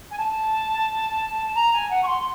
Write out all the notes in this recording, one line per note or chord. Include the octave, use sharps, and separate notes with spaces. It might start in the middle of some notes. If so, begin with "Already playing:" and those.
G#5
A5
A#5
G#5
F#5
C#6
C6